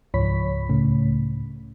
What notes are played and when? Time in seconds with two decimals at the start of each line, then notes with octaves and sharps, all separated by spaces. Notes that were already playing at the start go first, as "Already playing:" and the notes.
0.14 C#2 G#2 F3 C#5 B5 B6
0.69 C#2 A2 C#3 A3